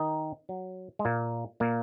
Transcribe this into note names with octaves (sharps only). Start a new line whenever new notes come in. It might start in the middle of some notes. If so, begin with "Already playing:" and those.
Already playing: D#3 D#4
F#3
G#3
A#2 A#3
A#2 A#3